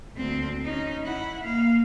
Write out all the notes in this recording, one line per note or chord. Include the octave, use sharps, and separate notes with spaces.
D2 C4
C#4 D#4
E4 F#5
A#3 F5